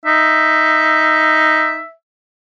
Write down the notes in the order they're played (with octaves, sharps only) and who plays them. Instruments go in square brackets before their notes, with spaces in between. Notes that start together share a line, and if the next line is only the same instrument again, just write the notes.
[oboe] D#4 [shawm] E5